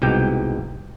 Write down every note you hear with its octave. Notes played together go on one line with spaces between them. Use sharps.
C2 G#2 B2 G4 G5